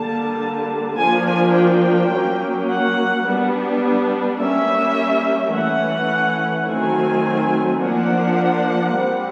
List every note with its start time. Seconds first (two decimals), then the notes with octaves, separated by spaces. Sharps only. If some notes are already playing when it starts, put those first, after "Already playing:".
Already playing: D3 G3 A#3 A5
0.98 F3 A#3 D4 G#5
1.27 G#5
1.55 G5
2.12 F#3 A#3 C#4
2.69 F#5
3.26 G3 B3 D4
4.40 G3 A#3 C#4 E5
5.54 E3 A3 C#4 F#5
6.68 D#3 F#3 A3 C4 G#5
7.81 F3 A#3 D4 F#5
8.96 G3 C4